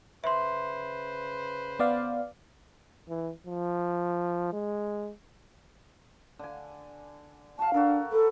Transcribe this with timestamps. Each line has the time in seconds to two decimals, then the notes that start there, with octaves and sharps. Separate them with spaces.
0.24 C#3 B4 C5 E5 C6
1.79 B3 D5 F5
3.09 E3
3.47 F3
4.53 G#3
6.39 D3 G#5
7.59 F#4 F5 A5
7.74 D4 F#4 A4 A#4
8.12 A4 B4